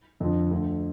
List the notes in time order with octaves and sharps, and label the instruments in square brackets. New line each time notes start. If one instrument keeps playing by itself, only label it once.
[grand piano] F2 D3 F3
D2 D3 F3